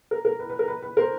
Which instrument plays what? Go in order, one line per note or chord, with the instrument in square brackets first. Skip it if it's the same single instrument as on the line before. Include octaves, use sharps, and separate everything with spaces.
[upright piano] A#4
A#4
B4
B4
A#4
B4
B4
A#4 C5